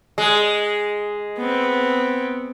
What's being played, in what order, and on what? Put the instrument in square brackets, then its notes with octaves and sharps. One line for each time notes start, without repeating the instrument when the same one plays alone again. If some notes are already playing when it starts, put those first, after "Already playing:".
[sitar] G#3
[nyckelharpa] B3 C4